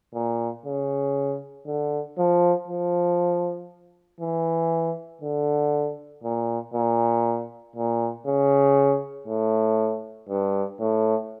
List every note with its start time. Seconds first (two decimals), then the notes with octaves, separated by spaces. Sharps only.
0.14 A#2
0.65 C#3
1.66 D3
2.18 F3
2.68 F3
4.20 E3
5.21 D3
6.24 A#2
6.74 A#2
7.76 A#2
8.27 C#3
9.27 A2
10.29 G2
10.80 A2